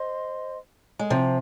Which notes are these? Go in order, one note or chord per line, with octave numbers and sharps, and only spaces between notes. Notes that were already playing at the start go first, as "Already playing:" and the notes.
Already playing: C5 D#5 C6
G#3
C3 F3